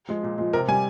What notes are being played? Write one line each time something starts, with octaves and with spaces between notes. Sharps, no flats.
F3 G#3
A#2
F3 G#3
C3 A#4
G3 G#5